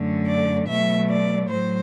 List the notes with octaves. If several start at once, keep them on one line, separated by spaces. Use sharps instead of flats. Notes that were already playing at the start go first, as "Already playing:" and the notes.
Already playing: F#2 D3 A3
D5
B2 F#3 A3 E5
D5
A2 F#3 C5